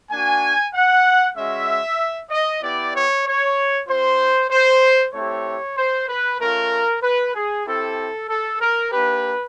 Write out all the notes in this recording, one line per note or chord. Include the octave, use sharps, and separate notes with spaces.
A#3 D4 F#4 G#5
F#5
G#3 C#4 F#4 E5
D#5
B3 E4 G4 D5
C#5
C#5
C4 F4 C5
C5
A3 C4 E4 G4 C#5
C5
B4
A3 C#4 F4 A#4
B4
G#4
C4 E4 G4 A4
A4
A#4
A#3 D4 G4 B4